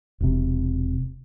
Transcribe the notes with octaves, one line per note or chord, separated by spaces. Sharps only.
E1 C3